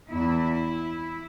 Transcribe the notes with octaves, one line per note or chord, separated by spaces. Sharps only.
E2 E3 E4